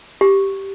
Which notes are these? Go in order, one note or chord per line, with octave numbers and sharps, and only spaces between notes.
G4